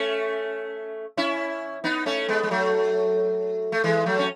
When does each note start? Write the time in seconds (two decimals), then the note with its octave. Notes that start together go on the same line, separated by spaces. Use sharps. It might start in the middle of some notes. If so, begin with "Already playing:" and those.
Already playing: A3 C#4
1.17 C#4 E4
1.84 B3 D#4
2.06 A3 C#4
2.28 G#3 B3
2.43 G#3
2.51 F#3 A3
3.72 A3
3.84 E3 G#3
4.06 F#3 A3
4.19 C#4